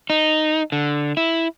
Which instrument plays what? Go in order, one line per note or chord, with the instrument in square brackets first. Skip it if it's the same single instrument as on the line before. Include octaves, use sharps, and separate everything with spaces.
[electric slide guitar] D#4
D3
E4